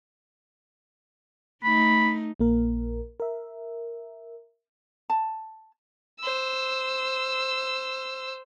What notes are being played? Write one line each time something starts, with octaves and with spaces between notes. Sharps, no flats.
A3 D#4 B5
A#1 A#3 A#4
A#4 E5
A5
C5 E6